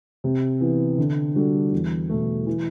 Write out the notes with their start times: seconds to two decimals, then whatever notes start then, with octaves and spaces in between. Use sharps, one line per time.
0.24 C3
0.61 E3 B3
0.98 D3
1.35 G3 D4 F#4 A4
1.72 E2
2.09 B2 A3
2.46 E3